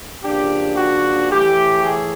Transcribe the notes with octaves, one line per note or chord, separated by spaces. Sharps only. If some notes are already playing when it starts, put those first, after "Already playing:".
C#3 F3 A#3 D4 G4
F#4
A2 E3 A3 G4
G#4